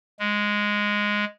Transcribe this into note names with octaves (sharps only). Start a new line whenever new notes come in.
G#3